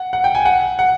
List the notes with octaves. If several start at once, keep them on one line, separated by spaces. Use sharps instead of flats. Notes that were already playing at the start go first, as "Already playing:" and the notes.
Already playing: F#5
F#5
G5
G#5
F#5
F#5